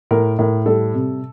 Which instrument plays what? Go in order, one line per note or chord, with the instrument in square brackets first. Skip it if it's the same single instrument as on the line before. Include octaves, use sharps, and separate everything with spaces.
[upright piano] A2 A#4
A2 A#4
G3 A4
C3